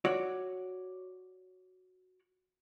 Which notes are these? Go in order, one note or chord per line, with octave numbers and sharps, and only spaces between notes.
F#4 C#5 D5